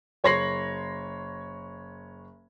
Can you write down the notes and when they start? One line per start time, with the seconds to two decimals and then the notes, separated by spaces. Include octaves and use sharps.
0.24 F#1 C#5 C6 A#6 C7 F#7